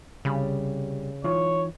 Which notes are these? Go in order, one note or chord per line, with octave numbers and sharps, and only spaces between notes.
C2 C#3 G3 B5
E3 D#4 F4 C#5